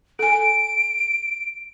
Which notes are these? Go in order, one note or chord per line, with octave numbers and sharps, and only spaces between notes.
A4 G#5 D7